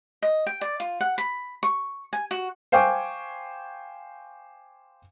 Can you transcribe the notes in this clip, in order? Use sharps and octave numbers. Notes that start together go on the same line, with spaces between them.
D#5
G5
D5
F4
F#5
B5
C#6
G#5
F#4
C5 F5 G5 G#5 C#6 D6